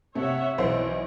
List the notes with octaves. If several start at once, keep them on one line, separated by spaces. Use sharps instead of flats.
C3 C#5 E5 F#5
B1 E3 C5